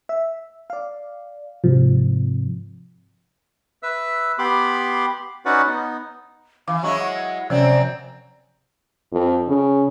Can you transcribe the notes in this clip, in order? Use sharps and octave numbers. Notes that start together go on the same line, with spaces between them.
E5
D5 F5
G#2 C3 F3
B4 E5 E6
B3 G4 B5 C6 D6
C#4 D#4 F#4 B4 D5 F#5
B3 D#4
E3 F5 D6
F#3 G#3 E4 C#6
F#5
F#2 C3 F3 F#3 C4 D5
F2
C#3